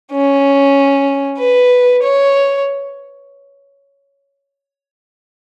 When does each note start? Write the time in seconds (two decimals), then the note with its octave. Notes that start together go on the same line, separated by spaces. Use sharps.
0.11 C#4
1.39 B4
2.02 C#5